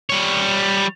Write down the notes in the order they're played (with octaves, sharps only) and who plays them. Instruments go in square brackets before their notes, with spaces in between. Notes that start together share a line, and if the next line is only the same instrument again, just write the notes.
[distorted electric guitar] G3 C#5